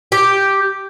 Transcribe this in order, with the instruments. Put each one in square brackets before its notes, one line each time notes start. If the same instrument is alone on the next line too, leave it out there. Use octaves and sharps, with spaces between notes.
[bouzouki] G4